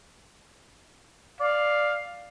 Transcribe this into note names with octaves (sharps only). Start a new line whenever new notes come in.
D5 F5